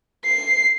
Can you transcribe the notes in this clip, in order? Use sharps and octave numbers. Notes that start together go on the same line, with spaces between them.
C7